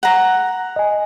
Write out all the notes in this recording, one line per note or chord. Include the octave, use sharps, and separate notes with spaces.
F#5 A#5
D#5 G#5